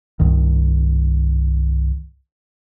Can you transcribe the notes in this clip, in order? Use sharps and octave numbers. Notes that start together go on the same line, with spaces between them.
C2 G2 D#3